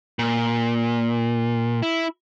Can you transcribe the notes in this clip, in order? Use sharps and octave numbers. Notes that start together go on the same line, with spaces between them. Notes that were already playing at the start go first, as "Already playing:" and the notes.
A#2
E4